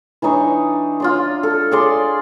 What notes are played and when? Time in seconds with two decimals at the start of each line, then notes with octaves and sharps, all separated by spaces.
0.22 E3 D4 D#4 C#6
1.00 F4 D5 C6
1.43 A4
1.71 G#4 D5 C6